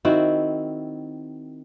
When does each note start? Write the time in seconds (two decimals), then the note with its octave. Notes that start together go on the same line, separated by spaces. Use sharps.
0.05 D#3 C4 E4 F#4